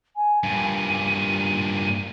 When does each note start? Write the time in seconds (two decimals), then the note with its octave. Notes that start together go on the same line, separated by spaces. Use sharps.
0.16 G#5
0.44 G2 A#2 D#7